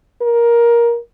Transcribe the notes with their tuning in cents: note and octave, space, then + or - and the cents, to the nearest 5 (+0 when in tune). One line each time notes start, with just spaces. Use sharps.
A#4 +15